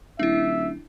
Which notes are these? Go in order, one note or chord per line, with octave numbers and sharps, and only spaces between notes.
D#1 D4 E4 E5